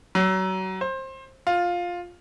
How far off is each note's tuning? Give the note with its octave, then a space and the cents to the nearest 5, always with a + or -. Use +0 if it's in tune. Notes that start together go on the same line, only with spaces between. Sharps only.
F#3 +30
C5 +20
F4 +10